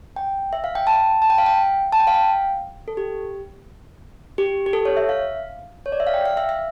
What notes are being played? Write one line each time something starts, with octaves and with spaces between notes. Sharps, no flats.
G5
E5
F5
G5
A5
A5
G5
F5
G5
A5
G5
F5
G5
A4
G4
G4
G4
A4
C#5
E5
F5
C#5
D5
E5
F5
G5
F5
E5
E5